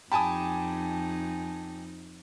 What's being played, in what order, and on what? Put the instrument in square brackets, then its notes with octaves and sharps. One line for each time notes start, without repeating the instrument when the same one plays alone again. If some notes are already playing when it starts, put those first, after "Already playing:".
[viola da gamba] F2 D#4 [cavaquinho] G4 D#6 [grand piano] G#5 A5 B5